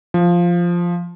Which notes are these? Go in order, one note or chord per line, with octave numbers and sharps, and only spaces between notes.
F3